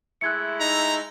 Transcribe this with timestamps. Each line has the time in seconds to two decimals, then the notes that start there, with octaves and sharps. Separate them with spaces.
0.21 G#3 A3 E4 F#6 G#6 C#7
0.60 D#4 A#5